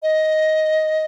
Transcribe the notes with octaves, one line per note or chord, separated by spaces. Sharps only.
D#5